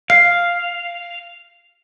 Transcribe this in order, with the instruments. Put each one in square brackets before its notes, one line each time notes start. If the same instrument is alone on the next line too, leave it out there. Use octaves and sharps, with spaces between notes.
[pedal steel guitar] F5 [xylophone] C7